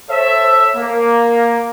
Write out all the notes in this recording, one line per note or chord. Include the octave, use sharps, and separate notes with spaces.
A4 C5 C#5 E5
A#3